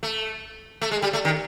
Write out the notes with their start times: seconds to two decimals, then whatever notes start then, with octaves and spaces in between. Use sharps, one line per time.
0.03 A3
0.81 A3
0.91 G#3
1.02 G3
1.13 A3
1.25 D#3